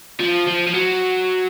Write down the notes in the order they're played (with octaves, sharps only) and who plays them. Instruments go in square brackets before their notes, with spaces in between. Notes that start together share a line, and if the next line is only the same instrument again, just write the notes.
[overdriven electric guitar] F3
F3
F3
F#3